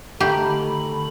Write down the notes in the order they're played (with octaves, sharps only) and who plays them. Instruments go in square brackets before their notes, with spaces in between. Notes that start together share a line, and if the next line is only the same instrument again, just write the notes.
[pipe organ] D3 B5 [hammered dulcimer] D#3 A3 [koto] G4